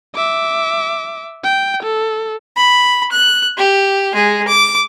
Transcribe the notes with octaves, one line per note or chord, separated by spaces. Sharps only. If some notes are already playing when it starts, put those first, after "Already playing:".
E5 D6
G5
A4
B5
F#6
G4
G#3 G#4
D6